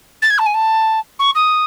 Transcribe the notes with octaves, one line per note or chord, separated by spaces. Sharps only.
A6
G#6
A5
G#5
A5
C#6
D#6